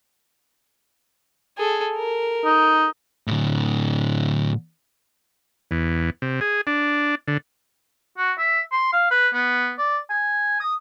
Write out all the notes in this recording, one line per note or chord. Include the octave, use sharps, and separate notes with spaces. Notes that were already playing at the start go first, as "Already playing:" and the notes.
G#4 A4
A#4
D#4
A2 D3
E2
C3
G#4
D4
D3
F#4
E5
C6
F5
B4
B3
D5
G#5
D#6